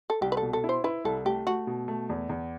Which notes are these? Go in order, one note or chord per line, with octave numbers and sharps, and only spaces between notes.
A4
C2 G4
B4
A4
B2
A4
E4
C5
E4 B4
C2 A4
A3 G4
A3 F#4
B2
A3
E2
E2